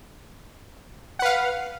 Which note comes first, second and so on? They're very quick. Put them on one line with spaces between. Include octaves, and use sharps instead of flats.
F#5 B4 F5